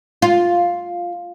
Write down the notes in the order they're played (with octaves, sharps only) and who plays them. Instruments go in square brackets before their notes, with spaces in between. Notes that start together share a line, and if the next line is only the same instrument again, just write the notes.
[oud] F4